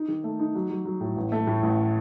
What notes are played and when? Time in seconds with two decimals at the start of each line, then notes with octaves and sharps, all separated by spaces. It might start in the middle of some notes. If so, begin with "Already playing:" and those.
Already playing: D#4
0.08 D#3
0.24 A3
0.39 D#4
0.55 F#3
0.70 F#3
0.85 F#3
1.01 A2
1.16 A1
1.32 A3
1.47 A2
1.63 A1